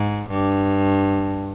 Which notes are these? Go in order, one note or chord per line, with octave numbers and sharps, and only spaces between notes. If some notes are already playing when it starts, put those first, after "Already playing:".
Already playing: G#2
G2